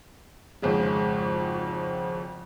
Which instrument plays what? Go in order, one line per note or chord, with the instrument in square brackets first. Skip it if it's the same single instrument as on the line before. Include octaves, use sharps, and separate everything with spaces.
[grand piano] G#1 F2 C#3 G#3